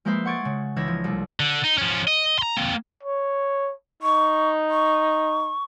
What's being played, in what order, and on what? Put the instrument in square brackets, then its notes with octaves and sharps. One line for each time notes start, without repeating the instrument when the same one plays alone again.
[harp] F3 G#3 A#3 B4 C5 E5
F#5 C6 C#6 G#6 A6 D7
C#3
C#2 E3 D4 E5 G#6 A#6
F3
C2 A3
[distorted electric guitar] D3
D#4
F3 C#4
D#5
A#5 C6
A#3 C4
[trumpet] C#5
[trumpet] D#4 [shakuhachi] C#6
[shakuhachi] C#6